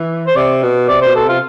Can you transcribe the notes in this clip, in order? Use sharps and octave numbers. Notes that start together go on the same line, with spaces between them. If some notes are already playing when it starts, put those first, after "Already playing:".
Already playing: E3
C5
C3 D5
B2
C3 D5
B2 C5
A4
C3 F4